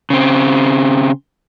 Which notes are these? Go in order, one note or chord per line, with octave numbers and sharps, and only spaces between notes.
C#3 C4